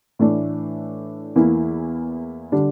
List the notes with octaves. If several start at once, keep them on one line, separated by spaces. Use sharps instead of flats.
A2 E3 A3 D4
E2 E3 A#3 E4
D3 G3 D4